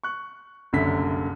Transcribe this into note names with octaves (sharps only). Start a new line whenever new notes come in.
C#6 F#6
F#1 C2 F#2 D3 B5 B6